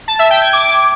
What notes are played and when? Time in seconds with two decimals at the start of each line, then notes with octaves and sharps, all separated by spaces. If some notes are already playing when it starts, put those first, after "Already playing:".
0.08 A5
0.19 E5
0.30 G5
0.42 G#6
0.53 D6